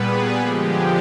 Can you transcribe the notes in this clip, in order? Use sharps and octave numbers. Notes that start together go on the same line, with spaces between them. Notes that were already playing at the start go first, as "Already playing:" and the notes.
Already playing: A#2 G3 B3 G#4 B4
D3 F3 G#3 G4